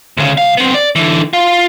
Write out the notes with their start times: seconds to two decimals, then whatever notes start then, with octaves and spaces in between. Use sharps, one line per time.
0.17 D2 C#3
0.38 C2 F5
0.57 B3 C4
0.74 D5
0.96 D3 E3
1.33 F4 F5